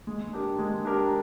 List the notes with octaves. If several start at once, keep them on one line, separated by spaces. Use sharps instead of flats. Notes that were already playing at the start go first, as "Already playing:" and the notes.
G#3
D4 G4 A#4
G#3
D4 G4 A#4